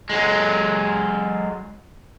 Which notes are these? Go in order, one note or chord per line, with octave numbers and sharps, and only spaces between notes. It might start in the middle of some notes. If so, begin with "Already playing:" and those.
F#3 G#3